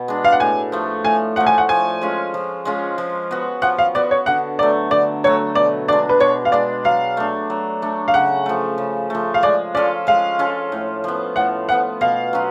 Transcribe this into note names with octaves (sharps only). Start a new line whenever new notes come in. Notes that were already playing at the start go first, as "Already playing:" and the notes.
Already playing: B2
G#3 D4
F5
F#5
A2 G#5
F3 A3
A2 G#5
F3 A3 F#5
G#5
F#5
F3 G#5
G#3 C#4 F4
F3
G#3 C#4 F4
F3
B3 F#4
F3 F#5
F5
B3 F#4 D5
C#5
D3 F#5
F#3 A3 D5
D3 D5
F#3 A3 C#5
B2 D5
G#3 D4 D5
B4
B2 C#5
F5
G#3 D4 D5
F#3 F5
A3 D4
F#3
A3 D4
F5
C#3 F#5
F3 A3
C#3
F3 A3
F5
G#3 D5
C#4 F4 A4 D5
G#3 F5
C#4 F4 A4
A2
F3 B3
A2 F#5
F3 B3 F#5
B2 F5
F#3 C#4 F4